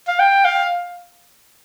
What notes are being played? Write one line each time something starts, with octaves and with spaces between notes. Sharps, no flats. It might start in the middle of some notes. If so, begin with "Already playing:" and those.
F5
G5
F5